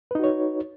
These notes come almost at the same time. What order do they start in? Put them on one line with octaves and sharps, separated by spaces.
B4 D#4 F#4 C#5